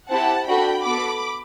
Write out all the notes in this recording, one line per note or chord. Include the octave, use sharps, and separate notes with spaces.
C4 E4 G4 F#5 A5
D4 F#4 A4 G5 B5
B3 F#4 A4 B5 D6